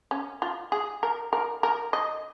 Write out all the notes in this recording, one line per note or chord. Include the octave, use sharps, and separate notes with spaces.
C#4
F4
G#4
A#4
A#4
A#4
D#5